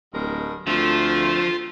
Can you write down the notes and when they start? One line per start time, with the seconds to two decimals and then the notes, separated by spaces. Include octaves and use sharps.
0.13 D1 G2 G#3 A#4
0.67 D2 F3 A3 A#3 C4 F4